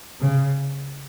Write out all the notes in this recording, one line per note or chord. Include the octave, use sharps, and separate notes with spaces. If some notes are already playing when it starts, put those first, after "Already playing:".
C#3